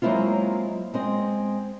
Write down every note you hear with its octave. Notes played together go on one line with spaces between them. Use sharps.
F#3 G#3 A#3 C4 E4 F4
G#3 C4 D#5